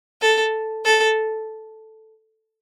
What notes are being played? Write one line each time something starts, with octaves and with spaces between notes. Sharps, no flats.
A4
A4